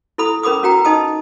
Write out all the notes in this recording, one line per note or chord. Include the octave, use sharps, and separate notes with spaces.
E4 A4 B5 D#6
C#4 A#4 B5 D6 D#6
C#4 F#4 A#4 G5 A#5
D#4 D#5 A5 D#6